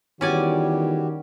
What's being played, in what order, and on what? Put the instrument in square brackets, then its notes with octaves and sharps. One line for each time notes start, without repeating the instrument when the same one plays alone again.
[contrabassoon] E2 [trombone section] D#3 [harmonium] G3 F#4 G4 [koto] C#4 D5 G#5